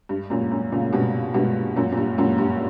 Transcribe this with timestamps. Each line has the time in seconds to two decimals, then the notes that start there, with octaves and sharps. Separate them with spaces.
0.09 G2
0.30 F#2 A#2
0.51 F#2
0.72 A#2 C#3
0.93 G2 B2
1.34 G2 B2
1.76 F#2 A#2
1.92 A#2
1.97 G2
2.18 F#2 A#2
2.38 G2